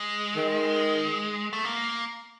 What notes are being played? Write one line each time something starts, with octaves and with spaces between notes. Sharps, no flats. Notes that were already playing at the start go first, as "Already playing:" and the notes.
Already playing: G#3
D#3
A3
A#3